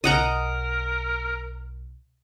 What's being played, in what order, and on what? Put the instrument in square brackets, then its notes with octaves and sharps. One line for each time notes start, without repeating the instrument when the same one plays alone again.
[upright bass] B1 [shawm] A#4 [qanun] D#5 F#5 A#5